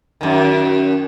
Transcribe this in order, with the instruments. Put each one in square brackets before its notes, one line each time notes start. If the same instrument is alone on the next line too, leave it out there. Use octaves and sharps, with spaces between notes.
[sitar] F#2 D#3